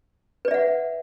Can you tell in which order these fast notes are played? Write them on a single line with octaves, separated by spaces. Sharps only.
B4 D5 E5 F#5